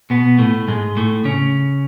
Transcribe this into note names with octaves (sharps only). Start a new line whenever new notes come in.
B2 B3
A2 A3
G#2 G#3
A2 A3
C#3 C#4